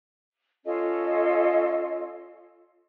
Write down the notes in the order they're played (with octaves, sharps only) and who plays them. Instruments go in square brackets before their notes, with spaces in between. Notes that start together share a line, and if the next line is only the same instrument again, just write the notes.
[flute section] C#4 F4 A4 D#5